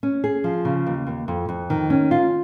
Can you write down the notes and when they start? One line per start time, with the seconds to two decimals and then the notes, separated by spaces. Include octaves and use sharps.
0.03 C#4
0.24 G#4
0.44 F3
0.65 C#3
0.87 D#2
1.07 D#2
1.28 F2
1.49 F2
1.70 D#3
1.90 C#4
2.11 F4